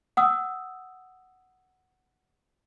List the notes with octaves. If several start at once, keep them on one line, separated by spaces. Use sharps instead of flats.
F#5 D#6 E6